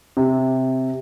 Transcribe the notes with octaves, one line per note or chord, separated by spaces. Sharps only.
C3